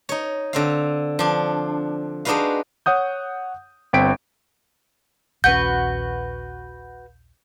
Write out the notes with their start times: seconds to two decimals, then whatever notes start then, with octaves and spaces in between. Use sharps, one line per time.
0.09 D#4 C#5
0.53 D3 C4 F5
1.19 F3 D4
2.25 G#3 D4 D#4 F#4 B4 F5
2.86 C#5 F#5 D#6 G6
3.93 G1 C4 G5 B6 D7
5.44 A#1 D#2 C#4 F#4 B4 G6